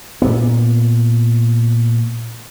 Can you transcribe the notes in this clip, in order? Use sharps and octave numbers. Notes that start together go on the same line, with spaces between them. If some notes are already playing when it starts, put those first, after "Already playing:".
A#2 B3